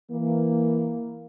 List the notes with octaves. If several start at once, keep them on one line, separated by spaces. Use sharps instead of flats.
E3 A#3